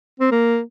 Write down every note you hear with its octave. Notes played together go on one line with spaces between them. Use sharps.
C4
A#3